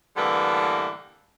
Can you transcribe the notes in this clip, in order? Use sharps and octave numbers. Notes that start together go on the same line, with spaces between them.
A2 D3 E3 G3 A#3 B3